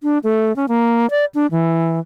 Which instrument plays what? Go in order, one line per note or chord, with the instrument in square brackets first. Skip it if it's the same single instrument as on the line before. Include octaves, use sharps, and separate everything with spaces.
[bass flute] D4
A3
C#4
A#3
D5
D4
E3